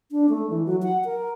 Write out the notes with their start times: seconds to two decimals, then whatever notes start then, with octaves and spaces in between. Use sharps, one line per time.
0.11 D4
0.29 A3
0.50 E3
0.66 F#3
0.82 F#5
1.05 A#4